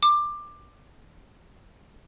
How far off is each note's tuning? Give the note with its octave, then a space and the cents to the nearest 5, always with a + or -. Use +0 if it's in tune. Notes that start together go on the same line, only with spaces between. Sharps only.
D6 +15